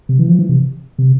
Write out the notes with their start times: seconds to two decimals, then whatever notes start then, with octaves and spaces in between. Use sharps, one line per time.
0.09 C3
0.19 E3
0.29 F3
0.39 E3
0.49 C3
0.98 C3